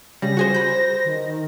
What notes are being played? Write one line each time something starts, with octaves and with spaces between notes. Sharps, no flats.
C#3 G3 A#6
F#4 G#4 C5
C5 B5 G6
D#3